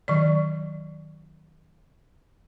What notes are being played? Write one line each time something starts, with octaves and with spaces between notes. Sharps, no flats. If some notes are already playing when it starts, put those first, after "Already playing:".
D#3 F#3 D5